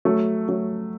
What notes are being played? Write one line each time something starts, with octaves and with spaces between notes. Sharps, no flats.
F#3 A3
F#3 A3